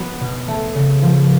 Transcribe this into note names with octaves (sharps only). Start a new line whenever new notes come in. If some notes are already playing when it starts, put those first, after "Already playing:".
Already playing: F#3 B3
B2
A3
C#3
F3